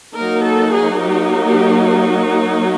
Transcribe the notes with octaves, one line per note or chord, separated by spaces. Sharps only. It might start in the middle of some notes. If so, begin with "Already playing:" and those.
F#3 A#3 D#4 A#4
A4
G#4
G4
G4